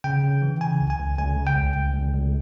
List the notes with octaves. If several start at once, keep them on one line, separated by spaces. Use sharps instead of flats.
C#3 G5
C#3
E3
C#3 G#5
C#2
G#5
C#2
C#2 G#5
C#3
G5
C#2
C#2
C#2
C#2